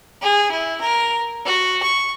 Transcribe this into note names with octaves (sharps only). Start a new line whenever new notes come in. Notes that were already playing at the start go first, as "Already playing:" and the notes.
G#4
E4
A#4
F#4
C#6